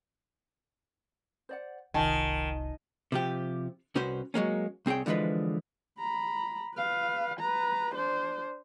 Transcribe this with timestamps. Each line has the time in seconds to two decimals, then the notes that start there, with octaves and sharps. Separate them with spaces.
1.49 C5 D5 F#5
1.94 F1 C2 D#3 F4 G#5 A5
3.12 C3 F3 G4
3.95 C2 C#4 F#4 B4 C5
4.34 F#3 G#3 A#3 C#4
4.86 C2 C4 G#4 C#5 G5
5.06 D3 E3 F3 G#3 B4
5.99 A#5 B5
6.75 B4 F5
7.40 B4 A#5
7.94 D4 C5